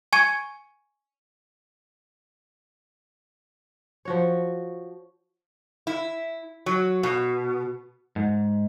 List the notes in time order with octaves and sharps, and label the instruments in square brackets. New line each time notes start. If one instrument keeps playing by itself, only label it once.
[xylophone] G#5 C#6 G#6 C#7 D#7
[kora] F3 F#4 C#5
[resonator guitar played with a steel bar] E4
F#3
B2
[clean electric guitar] G#2